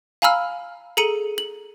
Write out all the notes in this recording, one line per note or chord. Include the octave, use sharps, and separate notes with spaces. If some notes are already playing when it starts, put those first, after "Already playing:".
F5 G#5 A#5 B5 E6 F6
G#4 A4 A#5 C#7 D#7 F#7
F#7